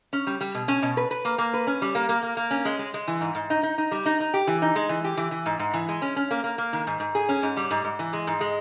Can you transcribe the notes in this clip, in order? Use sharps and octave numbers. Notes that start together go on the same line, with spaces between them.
C#4
G3
G3
B2
C#4
B2
B4
B4
A#3
A#3
B4
C#4
G3
A#3
A#3
A#3
A#3
C#4
G#3
G#3
G#3
E3
G#2
G#2
D#4
D#4
D#4
G3
D#4
D#4
G4
E3
D#4
G#3
E3
G4
E3
E3
G#2
G#2
E3
G#3
C#4
C#4
A#3
A#3
A#3
D#3
G#2
G#2
G#4
C#4
G#2
G3
G#2
G#2
E3
G#3
G#2
G#3